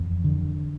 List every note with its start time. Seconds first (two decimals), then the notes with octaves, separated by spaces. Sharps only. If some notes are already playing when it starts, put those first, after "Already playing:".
Already playing: F2 E3
0.24 D3